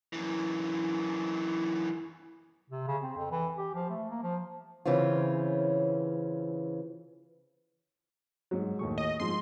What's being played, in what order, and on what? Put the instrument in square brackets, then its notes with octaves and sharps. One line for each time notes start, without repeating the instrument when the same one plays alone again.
[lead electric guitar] F#2 E3
[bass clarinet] C3
C#3
C4
F2
E3
G4
F3
A3
A#3
F3
[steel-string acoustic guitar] C#3 E3 C4 C#4 F4
[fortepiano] G#2 F#3
D#2 A2 C#6
[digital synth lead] D#5
[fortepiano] G#2 F3 [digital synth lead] C6